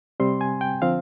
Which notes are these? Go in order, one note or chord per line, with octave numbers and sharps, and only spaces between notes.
C3 G3 C4 C6
G#5
G5
D3 F3 C4 F5